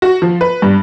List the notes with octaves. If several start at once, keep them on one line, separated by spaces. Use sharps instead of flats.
F#4
F3
B4
G2